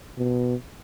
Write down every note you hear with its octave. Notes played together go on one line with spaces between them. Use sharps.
B2